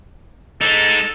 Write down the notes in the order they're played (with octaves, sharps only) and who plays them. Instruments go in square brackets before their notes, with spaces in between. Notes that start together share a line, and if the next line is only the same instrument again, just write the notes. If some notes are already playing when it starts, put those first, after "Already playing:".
[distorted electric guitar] G#3 D#4 [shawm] A4